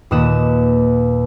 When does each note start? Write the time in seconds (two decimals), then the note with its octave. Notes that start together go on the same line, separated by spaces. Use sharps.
0.11 D#2 A#2 B4 D#6 F#6 E7